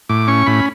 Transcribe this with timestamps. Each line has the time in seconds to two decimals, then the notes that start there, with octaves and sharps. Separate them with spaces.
0.09 A2 D6
0.28 C#4 C#6
0.46 A2 B5